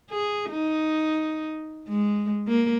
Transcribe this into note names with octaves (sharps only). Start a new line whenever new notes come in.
G#4
D#4
G#3
A#3